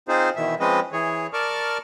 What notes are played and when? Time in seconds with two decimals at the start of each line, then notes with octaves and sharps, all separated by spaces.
0.08 C4 D#4 F4 G#4 C5
0.36 B2 D#3 E3 E5
0.60 F3 G#3 C4 C#4 B4 D#5
0.92 E3 G#4 C#5
1.33 A#4 D5 A5 C#6 D6 F6